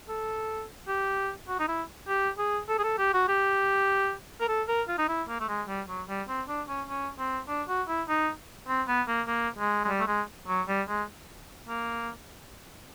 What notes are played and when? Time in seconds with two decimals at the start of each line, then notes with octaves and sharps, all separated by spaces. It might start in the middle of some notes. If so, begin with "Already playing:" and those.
0.09 A4
0.88 G4
1.48 F#4
1.59 D#4
1.68 E4
2.08 G4
2.38 G#4
2.69 A4
2.79 G#4
2.84 A4
2.98 G4
3.14 F#4
3.29 G4
4.41 A#4
4.49 A4
4.68 A#4
4.88 F4
4.98 D#4
5.09 E4
5.28 A#3
5.40 A3
5.49 G#3
5.68 G3
5.88 F#3
6.08 G3
6.28 C4
6.48 D4
6.68 C#4
6.88 C#4
7.19 C4
7.48 D4
7.68 F#4
7.88 E4
8.09 D#4
8.68 C4
8.88 B3
9.08 A#3
9.28 A#3
9.58 G#3
9.84 G#3
9.88 G3
9.99 A3
10.08 G#3
10.48 F#3
10.68 G3
10.89 G#3
11.68 A#3